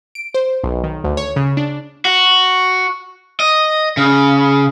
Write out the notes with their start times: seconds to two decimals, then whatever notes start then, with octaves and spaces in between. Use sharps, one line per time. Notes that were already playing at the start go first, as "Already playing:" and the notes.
0.15 D7
0.34 C5
0.64 B1
0.84 D#3
1.04 D2
1.17 C#5
1.36 C#3
1.57 D4
2.05 F#4
3.40 D#5
3.97 C#3